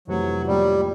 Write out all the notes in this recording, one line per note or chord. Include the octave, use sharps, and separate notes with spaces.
F2 C3 E3 F#3 A3
A2 F3 G3 A#3 D#4